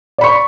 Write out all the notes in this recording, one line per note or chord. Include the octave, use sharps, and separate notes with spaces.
D5 B5 C#6